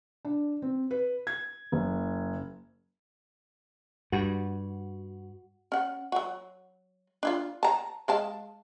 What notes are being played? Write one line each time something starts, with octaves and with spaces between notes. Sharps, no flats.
D4
C4
B4
G#6
F#1
G2 F#4
C#4 F#5
F#3 F#4
D4 E4 F4
A5 A#5
G#3 F5 A5